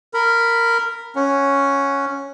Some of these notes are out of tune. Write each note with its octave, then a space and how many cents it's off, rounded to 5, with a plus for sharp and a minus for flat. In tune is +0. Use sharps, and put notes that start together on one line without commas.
A#4 -10 B5 +0
C#4 +0 F#5 +0